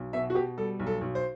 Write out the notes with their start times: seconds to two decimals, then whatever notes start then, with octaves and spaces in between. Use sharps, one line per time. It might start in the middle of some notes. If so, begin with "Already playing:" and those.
Already playing: B1
0.13 B2 E5
0.30 F#4
0.35 B2 G4
0.58 G3 A4
0.80 B1
0.86 A4
1.01 B1
1.15 C5